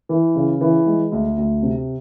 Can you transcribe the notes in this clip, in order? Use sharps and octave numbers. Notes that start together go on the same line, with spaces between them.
E3
C#3
E3
G#3
D2
D2
C3